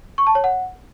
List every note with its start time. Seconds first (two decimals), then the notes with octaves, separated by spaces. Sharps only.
0.18 C#6
0.27 A5
0.35 C#5
0.44 F#5